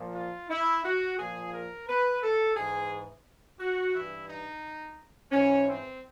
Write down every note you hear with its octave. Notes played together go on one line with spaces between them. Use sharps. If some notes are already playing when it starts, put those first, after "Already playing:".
Already playing: A#2 F3
F4
E4
F#4
A#2 F3 G#4
A#4
B4
A4
G#2 E3 G#4
F#4
G2 E3 E4
D#4
G#2 E3 C#4
C4